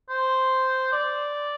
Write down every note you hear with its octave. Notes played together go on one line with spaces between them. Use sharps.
C5
D5